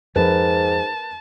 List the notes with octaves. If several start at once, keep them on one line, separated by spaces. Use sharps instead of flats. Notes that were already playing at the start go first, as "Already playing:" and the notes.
F2 G#2 F3 A#4 B4 A5